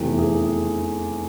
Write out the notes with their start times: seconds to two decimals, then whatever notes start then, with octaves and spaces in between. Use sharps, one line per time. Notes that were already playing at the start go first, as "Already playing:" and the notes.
Already playing: F1 E2 C3 E3 G4
0.18 G#4